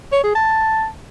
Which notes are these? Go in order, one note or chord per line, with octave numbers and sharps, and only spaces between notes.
C#5
G#4
A5